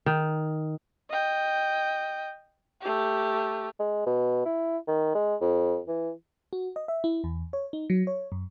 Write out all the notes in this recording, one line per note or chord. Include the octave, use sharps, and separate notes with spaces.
D#3
D#5 G5
A3 G4
G#3
B2
E4
D#3
G#3
F2
E3
F#4
D#5
E5
E4
E2
C#5
D#4
F#3
C#5
F#2